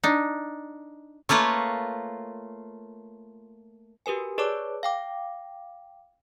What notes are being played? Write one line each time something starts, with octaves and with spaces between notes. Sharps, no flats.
D4 D#4
A3 A#3 F4 B4 C#5
F#4 G4 A#4 B4 G#5
G#4 B4 C#5 D5 A5 D6
F5 G5 D6